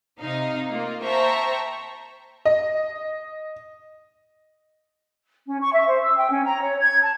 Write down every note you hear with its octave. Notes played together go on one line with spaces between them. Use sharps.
C3 D#4 F5
A#3 F4
C5 E5 G5 A5 A#5 C#6
D#5
C#4
C#6
E5
C5
E6
G5
C#4
A#5
C#5
G#6
A5